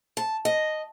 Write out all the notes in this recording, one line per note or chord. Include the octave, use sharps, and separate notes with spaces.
A5
D#5